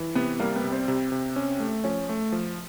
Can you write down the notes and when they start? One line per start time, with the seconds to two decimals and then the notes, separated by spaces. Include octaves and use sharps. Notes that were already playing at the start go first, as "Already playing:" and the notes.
Already playing: E3
0.15 C3 B3
0.39 G3 A#3
0.56 B3
0.64 C3
0.72 C4
0.88 C3
1.12 C3
1.36 C#4
1.60 A3
1.84 F3 C#4
2.09 A3
2.32 F3